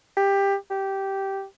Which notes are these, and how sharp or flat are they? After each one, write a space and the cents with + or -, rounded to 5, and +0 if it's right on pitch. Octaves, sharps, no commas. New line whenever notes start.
G4 +15
G4 -10